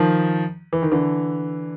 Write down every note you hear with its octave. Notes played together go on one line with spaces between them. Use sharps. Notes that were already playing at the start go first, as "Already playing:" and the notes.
Already playing: D#3 F3
E3
D#3
D3 E3